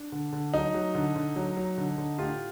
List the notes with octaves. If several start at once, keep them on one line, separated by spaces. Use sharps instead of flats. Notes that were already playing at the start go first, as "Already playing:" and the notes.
Already playing: D4
D3
D3
F#3 D#4
F#3
D3
D3
F#3
F#3
D3
D3
A2 F4 G4